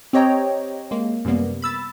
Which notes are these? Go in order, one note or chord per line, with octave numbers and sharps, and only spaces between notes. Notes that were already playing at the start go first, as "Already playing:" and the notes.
C4 G4 C#5 D#5 G5 A#5
G#3 A#3
F#2 C3 G3 A#3 B3
B5 E6 A6